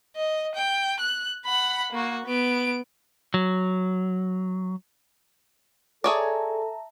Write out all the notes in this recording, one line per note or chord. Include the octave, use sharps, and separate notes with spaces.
D#5
G5
F#6
F#5 B5
A#3 F#4
B3 D7
F#3
G#4 A4 C#5 D5 E5 A5 A#5